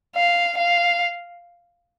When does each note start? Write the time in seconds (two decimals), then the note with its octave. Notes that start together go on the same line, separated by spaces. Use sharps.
0.16 F5
0.58 F5